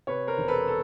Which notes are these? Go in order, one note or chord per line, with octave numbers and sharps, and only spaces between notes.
C3 B4 C#5
A#4 C5
E1
A4 B4
A4